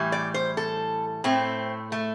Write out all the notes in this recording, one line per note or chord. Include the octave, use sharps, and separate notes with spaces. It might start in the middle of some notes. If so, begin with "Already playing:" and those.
Already playing: A2 E3 G3
D5
C5
A4
A2 A3 C4
A3